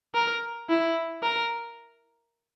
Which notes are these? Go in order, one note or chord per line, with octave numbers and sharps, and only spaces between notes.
A#4
E4
A#4